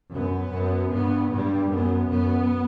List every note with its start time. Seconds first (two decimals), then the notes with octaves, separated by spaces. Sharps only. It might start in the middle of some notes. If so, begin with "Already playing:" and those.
0.12 F#2 B3
0.52 F#2
0.91 G2 B3
1.31 G2 G3
1.70 F#2 B3
2.10 F#2 B3